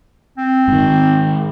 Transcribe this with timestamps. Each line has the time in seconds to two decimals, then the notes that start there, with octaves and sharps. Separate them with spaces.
0.38 C4
0.68 G#2 D#3